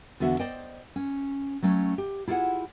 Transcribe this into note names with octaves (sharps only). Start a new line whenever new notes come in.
E2 D3 B3 F#4 E5
C5 D5 D#5 G5
C#4
F#3 A3 C#4
G4
E4 F4 G4 G#4 F#5